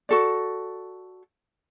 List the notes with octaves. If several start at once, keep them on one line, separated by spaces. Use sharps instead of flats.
F#4 A4 D5